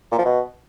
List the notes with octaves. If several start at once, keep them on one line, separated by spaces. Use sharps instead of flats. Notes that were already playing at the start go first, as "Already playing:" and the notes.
A#2
F3
B2